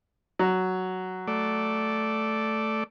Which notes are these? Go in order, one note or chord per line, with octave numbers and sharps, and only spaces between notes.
F#3
A3 D5